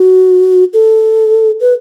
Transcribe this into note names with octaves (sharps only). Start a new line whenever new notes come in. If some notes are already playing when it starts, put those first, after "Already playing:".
Already playing: F#4
A4
B4